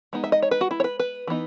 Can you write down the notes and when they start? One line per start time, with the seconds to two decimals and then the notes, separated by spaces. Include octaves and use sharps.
0.13 G#3 B3 D#4
0.24 E5
0.32 D#5
0.42 C#5
0.51 B4
0.61 F#4
0.71 E4
0.80 C#5
0.84 B4
0.99 B4
1.27 E3 B3 D#4